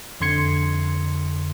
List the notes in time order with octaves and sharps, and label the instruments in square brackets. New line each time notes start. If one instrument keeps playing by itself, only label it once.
[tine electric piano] F2 D3 C6 G#6 C#7